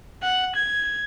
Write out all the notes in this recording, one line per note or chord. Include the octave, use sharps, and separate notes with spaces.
F#5
G#6